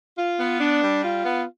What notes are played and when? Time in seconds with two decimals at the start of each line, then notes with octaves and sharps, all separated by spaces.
0.18 F4
0.40 B3
0.61 D4
0.83 G3
1.04 F4
1.26 B3